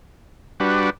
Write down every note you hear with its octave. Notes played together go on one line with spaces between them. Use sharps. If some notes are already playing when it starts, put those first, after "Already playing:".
G3 D4 F#4 B4